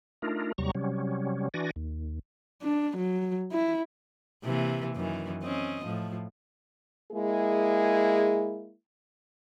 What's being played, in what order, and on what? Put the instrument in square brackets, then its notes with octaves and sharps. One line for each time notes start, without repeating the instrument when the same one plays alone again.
[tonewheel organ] A3 D4 D#4 F4 A#4
D#2 C3 F#3 G3 A#5 C#6
C3 F#3 G3 C#4
E3 D4 F#4 D5 G#5 A#6
D#2
[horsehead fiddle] D4
F#3
E4
[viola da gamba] C3 E3 A#3
F#2 D#3 E3
C4 C#4 D#5
A2 F3
[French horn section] G#3 A#3 E4 G#4